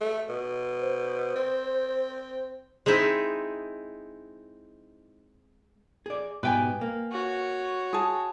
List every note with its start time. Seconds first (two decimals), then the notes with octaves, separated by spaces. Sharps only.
0.01 A3
0.29 B2
0.80 C5
1.35 C4
2.86 G#3 C4 D#4 E4
6.06 G#4 D5
6.43 G#2 B2 G4 B4 G5 G#5
6.81 A#3
7.12 F#4 C#5
7.93 G#4 A5